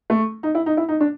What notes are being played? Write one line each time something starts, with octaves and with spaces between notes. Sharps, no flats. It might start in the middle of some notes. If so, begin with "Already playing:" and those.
A3
D#4
E4
D#4
E4
D#4
D4